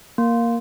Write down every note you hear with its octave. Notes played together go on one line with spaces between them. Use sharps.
A#3